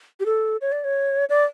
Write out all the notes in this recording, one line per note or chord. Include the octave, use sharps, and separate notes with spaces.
G4
A4
C#5
D5
C#5
D5